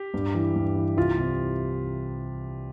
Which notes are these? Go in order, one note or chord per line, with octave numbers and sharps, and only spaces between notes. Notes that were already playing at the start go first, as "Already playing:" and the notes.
Already playing: G4
G2
E3
G2
E3
C2 F4
C3